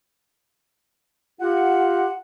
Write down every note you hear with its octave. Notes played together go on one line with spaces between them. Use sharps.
F4 G4 F#5